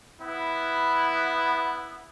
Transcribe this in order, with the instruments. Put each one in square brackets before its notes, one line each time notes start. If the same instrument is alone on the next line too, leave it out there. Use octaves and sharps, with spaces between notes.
[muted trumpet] B3 [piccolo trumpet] E4